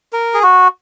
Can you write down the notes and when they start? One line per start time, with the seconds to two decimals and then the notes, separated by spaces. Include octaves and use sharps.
0.13 A#4
0.34 G#4
0.43 F#4